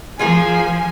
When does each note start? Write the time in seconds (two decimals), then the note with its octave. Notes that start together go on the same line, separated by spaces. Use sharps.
0.19 F3 F4 G#4 A#4 G#5